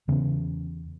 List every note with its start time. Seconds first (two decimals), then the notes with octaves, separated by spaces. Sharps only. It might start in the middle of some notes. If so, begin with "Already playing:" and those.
0.08 E2 C#3 E3 B3